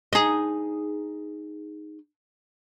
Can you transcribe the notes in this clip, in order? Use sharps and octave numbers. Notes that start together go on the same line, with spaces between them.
D#4 G#4